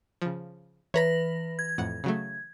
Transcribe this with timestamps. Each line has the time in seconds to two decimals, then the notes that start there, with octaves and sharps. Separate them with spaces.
0.22 C#3 F3
0.94 E3 B4 C#5 A#5 B5 A#6
1.59 G#6
1.78 F2 A2 F#5
2.04 C#3 F#3 A3